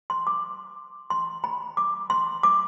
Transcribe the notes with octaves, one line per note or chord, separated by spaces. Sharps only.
C6
D6
C6
B5
D6
C6
D6